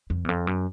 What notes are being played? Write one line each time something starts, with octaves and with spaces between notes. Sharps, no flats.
F2
E2
F2
F#2